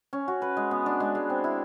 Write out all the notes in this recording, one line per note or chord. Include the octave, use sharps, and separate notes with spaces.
C#4
F#4
B4
G#3
B3
D4
G#3
G#3
C4
E4